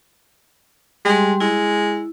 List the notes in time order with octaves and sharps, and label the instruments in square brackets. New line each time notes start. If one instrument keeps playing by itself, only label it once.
[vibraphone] G3 G4 C6 [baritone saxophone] G#3
[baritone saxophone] G#3 [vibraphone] E4